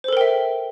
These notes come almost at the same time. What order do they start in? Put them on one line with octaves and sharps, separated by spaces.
C5 A4 A#4 G5 E5